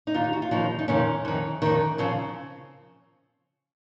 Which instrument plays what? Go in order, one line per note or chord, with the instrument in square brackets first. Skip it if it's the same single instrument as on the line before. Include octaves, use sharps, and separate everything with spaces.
[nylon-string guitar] D#4
D#2 D#3 F4
D#4
F#4
F4
D#2 C#3 F3 D#4
D#4
F2 C3 D#3 C#4
F2 D#3
F2 D#3
C#3 F3 C4